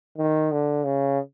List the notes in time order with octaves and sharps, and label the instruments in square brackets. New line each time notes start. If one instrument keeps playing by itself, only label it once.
[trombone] D#3
D3
C#3